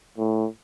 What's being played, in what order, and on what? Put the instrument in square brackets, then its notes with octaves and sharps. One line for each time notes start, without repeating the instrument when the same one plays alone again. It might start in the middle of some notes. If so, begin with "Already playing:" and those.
[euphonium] A2